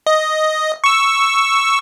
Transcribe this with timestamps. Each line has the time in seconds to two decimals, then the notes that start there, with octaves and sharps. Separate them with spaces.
0.07 D#5
0.84 C#6 E6